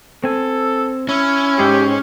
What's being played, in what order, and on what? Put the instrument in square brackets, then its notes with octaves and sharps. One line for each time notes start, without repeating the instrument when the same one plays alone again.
[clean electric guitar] C4 G#5 [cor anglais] A4
[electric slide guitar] C#4 [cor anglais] E4
[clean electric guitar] G#2 G#3 G#4 [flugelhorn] G4